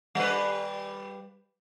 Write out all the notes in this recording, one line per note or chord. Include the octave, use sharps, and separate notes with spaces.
G3 B4